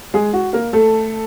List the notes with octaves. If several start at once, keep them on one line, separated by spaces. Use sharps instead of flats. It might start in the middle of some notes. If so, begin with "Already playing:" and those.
G#3 G#4
F#4
A#3 A#4
A3 A4